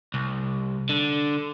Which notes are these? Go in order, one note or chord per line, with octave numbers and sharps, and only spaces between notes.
C2
D3